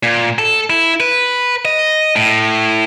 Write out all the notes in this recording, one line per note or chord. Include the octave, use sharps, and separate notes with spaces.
A#2
A4
E4
B4
D#5
A2